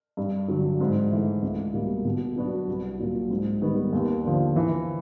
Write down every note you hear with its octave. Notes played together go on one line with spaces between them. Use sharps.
G2
D3 F#3
G#2
E3 A3
C#2
B2 G3 A#3
B2
F#3 B3 D4 F#4
C2
A#2 F#3
G#2
D#3 G3 B3
D#2
D3 F3
E3